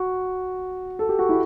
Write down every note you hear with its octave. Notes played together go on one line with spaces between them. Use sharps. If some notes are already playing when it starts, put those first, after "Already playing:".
Already playing: F#4
A4
G4
F#4
E4